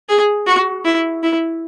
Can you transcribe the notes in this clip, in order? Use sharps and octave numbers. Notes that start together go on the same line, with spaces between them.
G#4
F#4
E4
E4